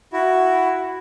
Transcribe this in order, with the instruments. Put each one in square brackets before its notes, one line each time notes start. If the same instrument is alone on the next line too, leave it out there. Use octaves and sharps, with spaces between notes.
[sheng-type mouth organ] E4 F#4